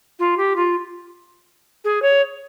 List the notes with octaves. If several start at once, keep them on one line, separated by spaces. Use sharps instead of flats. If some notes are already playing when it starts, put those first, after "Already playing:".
F4
G4
F4
G#4
C#5